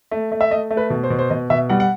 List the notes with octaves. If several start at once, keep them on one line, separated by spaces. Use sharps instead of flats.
A3
A3
E5
A3 D#5
A3
B4
B2
C5
B2
C5
B2 D#5
B2 E5
G3 F#5
F#5